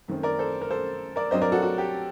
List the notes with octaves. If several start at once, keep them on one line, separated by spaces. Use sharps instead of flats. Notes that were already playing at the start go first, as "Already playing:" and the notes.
F#2 D#3 A3 C4
A#4 D5
A4 C5
A#4
A4 C5
A#4 D5
G2 F#3 C4 C5 D#5
A#4 D5
F#4 A4
F#4
G4